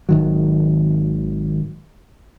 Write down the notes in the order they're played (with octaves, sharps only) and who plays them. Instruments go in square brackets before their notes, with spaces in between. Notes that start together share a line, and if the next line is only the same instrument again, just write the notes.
[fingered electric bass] G#1 D#3 F#3